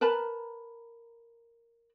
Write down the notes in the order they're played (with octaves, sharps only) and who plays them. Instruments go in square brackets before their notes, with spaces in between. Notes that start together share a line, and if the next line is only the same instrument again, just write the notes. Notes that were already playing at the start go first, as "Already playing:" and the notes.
[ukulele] A#4 B4 A5 B5